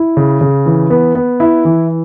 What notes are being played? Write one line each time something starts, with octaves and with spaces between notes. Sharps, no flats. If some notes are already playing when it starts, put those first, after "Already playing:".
Already playing: E4
C#3
C#3
E3
B3
B3
E4
E3